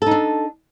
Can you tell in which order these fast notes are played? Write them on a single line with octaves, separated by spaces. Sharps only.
A4 D#4 D4